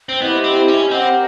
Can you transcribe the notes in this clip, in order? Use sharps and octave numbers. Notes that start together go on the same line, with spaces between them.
C4
B3 E4 G4 C5 D#5
C4
C#4
C4 G4 A#4 D#5 F#5